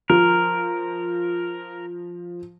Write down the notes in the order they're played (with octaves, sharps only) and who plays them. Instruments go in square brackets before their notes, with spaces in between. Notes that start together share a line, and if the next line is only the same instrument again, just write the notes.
[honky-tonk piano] F3 [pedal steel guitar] A#4